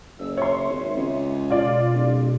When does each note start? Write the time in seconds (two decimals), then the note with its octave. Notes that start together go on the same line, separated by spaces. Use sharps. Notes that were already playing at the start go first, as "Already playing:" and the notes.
0.19 F#1 E6
0.37 C#5 E5 C6
0.70 G#1
0.96 C#2
1.50 B2 F4 D5
1.93 D1